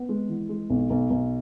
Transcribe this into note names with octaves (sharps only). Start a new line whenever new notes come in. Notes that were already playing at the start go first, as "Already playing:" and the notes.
Already playing: B3
G#3
E3
G#3
B1
B1
B1